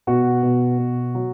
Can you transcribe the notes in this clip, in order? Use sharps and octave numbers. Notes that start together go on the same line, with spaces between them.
B2 F#4
B2
B2
F#3